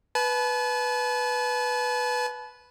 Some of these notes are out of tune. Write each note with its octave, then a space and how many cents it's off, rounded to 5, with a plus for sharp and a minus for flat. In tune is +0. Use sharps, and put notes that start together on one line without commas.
B4 +0 A5 -40